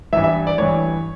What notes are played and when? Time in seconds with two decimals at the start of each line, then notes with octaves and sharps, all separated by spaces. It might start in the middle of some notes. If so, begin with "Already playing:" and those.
0.13 A1 G2 E3 E5
0.24 E5
0.47 D5
0.58 A1 G2 E3 C#5